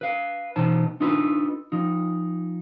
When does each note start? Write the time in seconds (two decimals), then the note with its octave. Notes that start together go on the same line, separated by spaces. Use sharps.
0.01 B4 F5
0.56 B2 E3 B3 D#4 C5 A5
1.00 D4 D#4 F4 A4 B4
1.72 F3 D#4